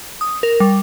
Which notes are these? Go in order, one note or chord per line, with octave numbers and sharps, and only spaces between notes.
D#6
A#4
G3